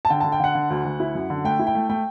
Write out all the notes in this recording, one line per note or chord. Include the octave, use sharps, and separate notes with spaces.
A5
D3 G5
D3 A5
G5
D3 F#5
D3
D2
D2
E4
F#2
D3
A3 G5
E4
G5
A3
A3 G5